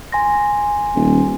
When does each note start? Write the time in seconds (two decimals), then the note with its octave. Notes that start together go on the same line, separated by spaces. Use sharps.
0.12 G#5 C6 A#6
0.95 D#1